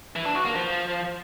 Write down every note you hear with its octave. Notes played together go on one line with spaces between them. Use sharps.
E3
D4
F#4
A#3
F3